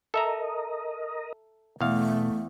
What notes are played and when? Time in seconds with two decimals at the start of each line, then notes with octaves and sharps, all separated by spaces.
0.14 A4 A#4 D#5 E5 A#5
1.81 E2 B2 A3 F5